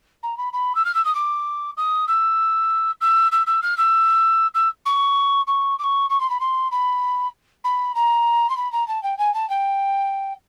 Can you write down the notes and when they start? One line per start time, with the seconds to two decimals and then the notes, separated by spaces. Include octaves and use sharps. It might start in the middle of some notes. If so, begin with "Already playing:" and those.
0.23 A#5
0.37 B5
0.53 B5
0.75 E6
0.84 F6
0.94 E6
1.05 D#6
1.15 D6
1.77 D#6
2.07 E6
3.01 E6
3.31 E6
3.46 E6
3.62 F6
3.77 E6
4.54 E6
4.85 C#6
5.47 C#6
5.78 D6
5.83 C#6
6.09 C#6
6.20 C6
6.29 B5
6.40 C6
6.71 B5
7.64 B5
7.95 A#5
8.49 C6
8.57 B5
8.72 A#5
8.87 A5
9.03 G5
9.18 G#5
9.34 A5
9.49 G5